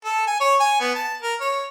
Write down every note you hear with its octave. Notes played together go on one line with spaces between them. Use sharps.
A4
G#5
C#5
G#5
B3
A5
A#4
C#5